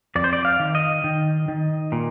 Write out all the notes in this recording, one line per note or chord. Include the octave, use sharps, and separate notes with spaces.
F2 D5
C5
D5
F5
D#3
D#5
D#3
D#3
A#2